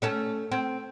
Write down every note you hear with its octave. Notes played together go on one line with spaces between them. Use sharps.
A3 C#4 A4
C4